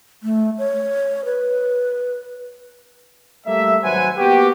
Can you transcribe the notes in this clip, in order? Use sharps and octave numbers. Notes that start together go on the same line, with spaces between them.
A3
C#5
B4
G3 A3 A#3 E5
G#1 F#3 B4 C5 F#5 G#5
A#3 B3 F#4 G4